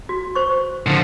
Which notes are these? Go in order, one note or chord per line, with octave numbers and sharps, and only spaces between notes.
F#4
C5 C#6
D3 F3